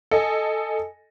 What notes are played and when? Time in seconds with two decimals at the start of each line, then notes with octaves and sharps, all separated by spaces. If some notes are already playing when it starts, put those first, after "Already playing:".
0.11 A4 D#5 G#5